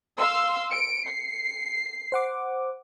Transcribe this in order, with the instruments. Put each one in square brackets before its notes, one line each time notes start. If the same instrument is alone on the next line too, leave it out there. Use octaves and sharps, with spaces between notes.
[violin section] F5 C6 E6
[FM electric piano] C#7 [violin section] D7
[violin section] C7
[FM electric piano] C5 F#5 D6